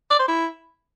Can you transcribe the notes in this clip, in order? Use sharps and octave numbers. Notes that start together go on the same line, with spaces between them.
D5
C5
E4